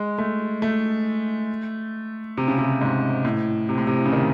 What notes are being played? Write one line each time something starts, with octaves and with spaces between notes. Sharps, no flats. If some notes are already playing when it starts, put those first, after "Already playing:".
Already playing: G#3
A3
A3
C3
C#3
C3
G#2
A2
C3
A2
C3
C#3
D#3